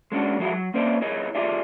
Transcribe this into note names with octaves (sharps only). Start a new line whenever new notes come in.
G#3 C#4 D4 F#4
F3 F#3 G#3 E4 F#4
F#3
A#3 C4 C#4 E4 C5 D5
E4 G#4 A#4 C#5 D#5
F4 G4 G#4 D5 E5